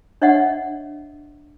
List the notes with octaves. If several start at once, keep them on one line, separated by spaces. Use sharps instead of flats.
D4 C#5 D#5 E5 F#5